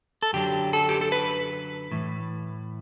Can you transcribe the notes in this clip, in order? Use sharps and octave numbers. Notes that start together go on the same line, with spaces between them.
A4
F#2 D3 F#3 G4
A4
G4
A4
B4
A2 E3